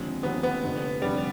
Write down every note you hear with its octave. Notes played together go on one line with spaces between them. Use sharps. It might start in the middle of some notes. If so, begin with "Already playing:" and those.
Already playing: D#2 D3 F3 G#3 C4
D#2 D3 F3 B3 C4
B3
F1 F2 D3
F1 F2 D3 G3